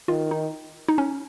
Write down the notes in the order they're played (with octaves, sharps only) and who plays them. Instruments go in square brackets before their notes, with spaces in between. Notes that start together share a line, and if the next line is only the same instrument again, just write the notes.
[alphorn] D#3 [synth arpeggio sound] F4
[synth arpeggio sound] D#4
D#4
C#4